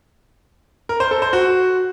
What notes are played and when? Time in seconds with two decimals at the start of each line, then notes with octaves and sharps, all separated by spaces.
0.89 A#4
1.00 C5
1.11 A4
1.22 C5
1.33 F#4